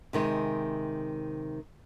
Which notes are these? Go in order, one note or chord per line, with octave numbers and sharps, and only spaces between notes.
C3 D#3 G#3